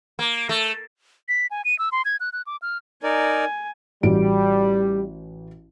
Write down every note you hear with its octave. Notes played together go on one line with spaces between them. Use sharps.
A#3
A3
B6
G#5
D#7
E6
C6
G#6
F#6
F#6
D6
F6
D#4 A#4 D5 G#5
A1 G3 F#4 D7